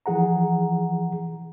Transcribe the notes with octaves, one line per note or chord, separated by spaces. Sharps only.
E3 F3 G#4 F#5 A#5